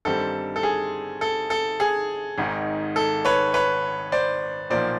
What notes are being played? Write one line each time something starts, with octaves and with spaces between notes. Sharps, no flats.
G1 G2 D#3 G3 C4 A4
A4
G#4
A4
A4
G#4
G#1 G#2 D#3
A4
B4 C#5
B4 C#5
C5 D5
B1 A#2 F3 A#3 C5 D5